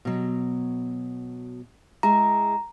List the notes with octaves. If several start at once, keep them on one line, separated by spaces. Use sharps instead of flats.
B2 F#3
G#3 E4 G#4 A#5